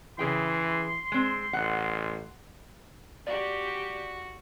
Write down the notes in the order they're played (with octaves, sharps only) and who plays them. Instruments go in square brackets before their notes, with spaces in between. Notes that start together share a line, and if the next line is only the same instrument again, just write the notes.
[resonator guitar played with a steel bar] C#3 G#4 G5 [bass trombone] E3 [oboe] C6
[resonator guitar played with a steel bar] G#3 C4
[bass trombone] A1 [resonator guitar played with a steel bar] F#5
[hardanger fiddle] F#4 [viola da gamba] G4 [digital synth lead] D5